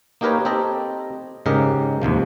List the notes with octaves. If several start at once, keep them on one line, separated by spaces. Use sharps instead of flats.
A#3 D#4 G4 A#4 B4 C#5
C4 G4 A4 D#5 A#5
G#2 C#3 G4 A#4 D#5
D#2 G#2 C3 F3